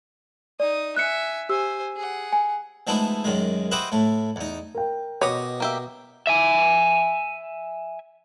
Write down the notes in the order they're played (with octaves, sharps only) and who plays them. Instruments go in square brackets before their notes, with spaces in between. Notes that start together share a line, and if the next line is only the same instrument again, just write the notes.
[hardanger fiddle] D#4 D#6 [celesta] D5
[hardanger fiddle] E5 G#5 [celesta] F#6 C#7
[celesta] G4 E6 [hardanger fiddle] C5 G#5
[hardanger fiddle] G#4 F#5
[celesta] G#5
[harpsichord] F3 G#3 A3 B3 D#4 E4
F#2 D#3 G#3
E4 F#4 G4 B4 C5 D#5
A2 A3
E2 D#4
[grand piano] A#4 G5
[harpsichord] B2 D#5 D6 [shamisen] B4 C#5
[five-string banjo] A#3 G4 E5
[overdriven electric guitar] E5 G#5